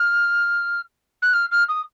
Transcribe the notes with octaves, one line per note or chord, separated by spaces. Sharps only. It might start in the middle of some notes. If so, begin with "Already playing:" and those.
Already playing: F6
F#6
F6
F6
D#6